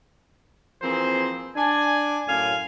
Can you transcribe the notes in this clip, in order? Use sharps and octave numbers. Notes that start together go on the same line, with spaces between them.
E3 F3 A#3 C4 G#4 C5
D4 G#5
F#2 A2 F5 G#5